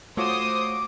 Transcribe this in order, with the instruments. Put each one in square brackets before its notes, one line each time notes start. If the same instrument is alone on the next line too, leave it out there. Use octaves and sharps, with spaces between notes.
[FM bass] A3 [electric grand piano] F4 F#4 C#5 [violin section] C5 D#6 [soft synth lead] D6